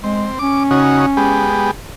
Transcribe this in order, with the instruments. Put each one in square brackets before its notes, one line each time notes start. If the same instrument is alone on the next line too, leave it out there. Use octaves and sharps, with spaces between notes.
[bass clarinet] G#3 [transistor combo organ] C4
[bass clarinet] C#4 [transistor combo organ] D6
[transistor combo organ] C#3 D#4 F#4
G#3 B3 G4